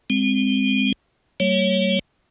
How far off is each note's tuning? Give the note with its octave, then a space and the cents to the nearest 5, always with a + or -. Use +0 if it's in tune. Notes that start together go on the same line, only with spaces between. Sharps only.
G#3 -30 C4 +0
G3 -35 A#3 -45 C#5 -5